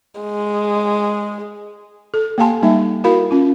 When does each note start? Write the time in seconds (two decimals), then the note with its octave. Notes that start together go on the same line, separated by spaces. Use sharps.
0.21 G#3
2.14 A4
2.38 A#3 G4 F5 G#5 A5 C6
2.62 G3 A#3 D#4 E5
3.04 E4 F#4 A#4 F5 B5
3.31 C#4 F4